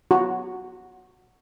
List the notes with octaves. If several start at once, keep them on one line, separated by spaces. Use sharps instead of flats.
F#4